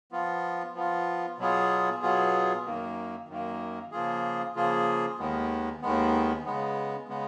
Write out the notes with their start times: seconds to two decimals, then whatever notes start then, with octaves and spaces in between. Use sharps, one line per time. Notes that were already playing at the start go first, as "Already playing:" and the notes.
0.12 F3 B3 F4
0.75 F3 B3 F4
1.38 B2 F#3 B3 F4 G#4
2.02 B2 F#3 B3 F4 G#4
2.65 F#2 D#3 A#3
3.29 F#2 D#3 A#3
3.91 C#3 F3 A#3 F4 G#4
4.55 C#3 F3 A#3 F4 G#4
5.19 D#2 D#3 G#3 B3
5.82 D#2 D#3 G#3 B3
6.46 C#3 G#3 B3
7.08 C#3 G#3 B3